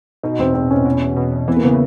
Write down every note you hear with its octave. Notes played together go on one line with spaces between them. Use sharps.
B2 D#4
E2 C4
E2 C4
E2 C#4
B2
E2
B2
E2
E3 B3
A#3
C#3 B3